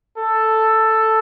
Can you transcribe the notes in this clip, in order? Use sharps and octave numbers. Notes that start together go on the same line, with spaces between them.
A4